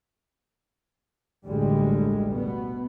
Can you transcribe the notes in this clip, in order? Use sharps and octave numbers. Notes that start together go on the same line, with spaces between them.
A1 D2 G2 D3 G3 G#3
B2 B3